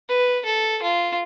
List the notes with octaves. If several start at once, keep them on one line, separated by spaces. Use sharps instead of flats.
B4
A4
F4